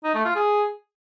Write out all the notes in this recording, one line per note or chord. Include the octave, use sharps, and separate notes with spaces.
D#4
A3
F4
G#4